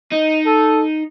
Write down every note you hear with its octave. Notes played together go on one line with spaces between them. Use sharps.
D#4 D#5
A4